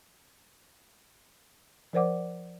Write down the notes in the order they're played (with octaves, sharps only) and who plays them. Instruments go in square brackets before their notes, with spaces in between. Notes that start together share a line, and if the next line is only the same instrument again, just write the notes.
[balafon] F3 A#4 C5 D5 F#5 D6